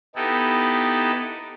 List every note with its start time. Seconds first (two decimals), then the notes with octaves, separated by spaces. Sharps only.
0.16 B3 D#4 E4 G4 A4